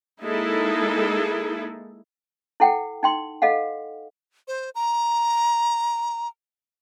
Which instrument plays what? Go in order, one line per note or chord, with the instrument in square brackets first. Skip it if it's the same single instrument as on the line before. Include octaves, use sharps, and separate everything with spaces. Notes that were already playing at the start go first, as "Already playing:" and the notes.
[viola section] G#3 A#3 D#4 E4 G#4 A4
[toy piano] E4 A4 F#5 G5
D#4 G5 C6
A4 D#5 F5 F#5
[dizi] C5
A#5